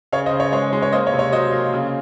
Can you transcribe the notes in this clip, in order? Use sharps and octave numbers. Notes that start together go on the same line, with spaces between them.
C#3 C#5 F5
C5 D#5
C#3
C#5
G#3 C#5
G#3
C#5
A#3 C5 D#5
C#5
C3
C#5
F#3 C5 D#5
A#3
C#3